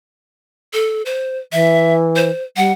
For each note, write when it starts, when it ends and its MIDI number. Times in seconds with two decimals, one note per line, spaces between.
0.73 1.02 69
1.05 1.38 72
1.52 2.30 52
1.52 1.95 76
2.16 2.43 72
2.57 2.72 55
2.57 2.72 78